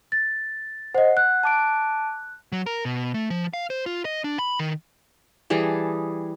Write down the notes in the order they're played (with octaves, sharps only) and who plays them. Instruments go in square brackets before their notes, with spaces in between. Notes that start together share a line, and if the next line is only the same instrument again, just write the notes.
[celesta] A6
[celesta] C5 D#5 [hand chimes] F#5
[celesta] F#6
[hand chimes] A5 D6 D7
[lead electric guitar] F#3
A#4
B2
A3
F3
F5
C5
F4
D#5
D4
B5
D#3
[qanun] E3 G3 G#4 A5